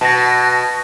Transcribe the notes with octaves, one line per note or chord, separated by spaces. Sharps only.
B2 A5 A#6